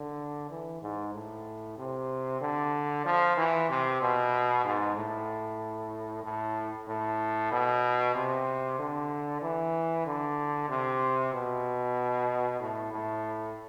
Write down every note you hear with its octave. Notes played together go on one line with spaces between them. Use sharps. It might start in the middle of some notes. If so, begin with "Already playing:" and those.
Already playing: D3
E3
G#2
A2
C3
D3
F3
E3
C3
B2
G#2
A2
A2
A2
B2
C3
D3
E3
D3
C3
B2
A2
A2